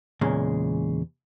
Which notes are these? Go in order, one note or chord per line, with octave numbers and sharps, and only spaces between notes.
E2 A#2 C#3 G#3